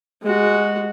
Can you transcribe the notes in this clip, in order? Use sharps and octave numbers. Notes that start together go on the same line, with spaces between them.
G#3 F#4